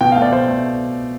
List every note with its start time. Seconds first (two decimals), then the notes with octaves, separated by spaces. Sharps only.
0.01 B2 G5
0.12 F5
0.16 A3
0.22 D5
0.32 B2 C5
0.48 A3